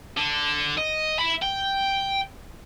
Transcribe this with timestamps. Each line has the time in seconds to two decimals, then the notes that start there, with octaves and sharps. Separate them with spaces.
0.17 D3
0.77 D#5
1.19 E5 B5
1.42 G5